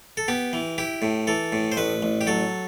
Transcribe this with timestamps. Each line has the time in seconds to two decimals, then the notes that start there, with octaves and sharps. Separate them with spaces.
0.17 A4
0.28 B3 G4
0.53 E3
0.78 E4 G4
1.02 A2
1.27 E3 A4
1.53 A2
1.72 C5
1.77 A1 B4
2.02 A1
2.21 G4
2.27 F#3 A4